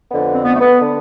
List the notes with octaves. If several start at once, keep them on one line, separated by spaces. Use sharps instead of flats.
F2 D3 B3
C4
B3
A3
B3
D3